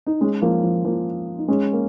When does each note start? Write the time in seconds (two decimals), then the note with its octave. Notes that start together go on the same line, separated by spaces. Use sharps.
0.06 D#4
0.21 G#3 C#4
0.42 F3 A#3
0.63 F3
0.84 F3 A#3
1.38 D#4
1.48 G#3 C#4
1.73 A#3